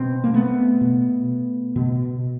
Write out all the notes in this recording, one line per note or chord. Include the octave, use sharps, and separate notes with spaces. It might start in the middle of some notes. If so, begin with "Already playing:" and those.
Already playing: B2 C4
A#3
A3 B3
B2
B2